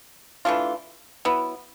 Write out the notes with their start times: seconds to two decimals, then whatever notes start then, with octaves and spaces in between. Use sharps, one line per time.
0.45 E3 A3 D4 F4
1.25 F#3 B3 E4